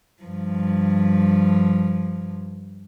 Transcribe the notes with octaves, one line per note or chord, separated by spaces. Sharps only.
G2 F3